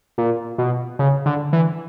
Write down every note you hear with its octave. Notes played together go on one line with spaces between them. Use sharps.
A#2
B2
C#3
D3
E3